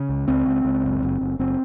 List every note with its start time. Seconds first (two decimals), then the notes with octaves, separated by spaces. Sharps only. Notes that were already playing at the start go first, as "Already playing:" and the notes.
Already playing: C#3
0.09 C#2
0.28 C#2 C4
0.46 C#2
0.65 C#2
0.84 F#1
1.03 F#1
1.21 F#1
1.39 F#1 C4